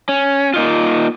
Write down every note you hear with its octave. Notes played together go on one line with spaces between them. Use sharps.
C#4
A#3 D#4 F4